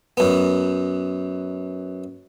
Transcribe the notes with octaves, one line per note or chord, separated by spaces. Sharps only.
F#2 B3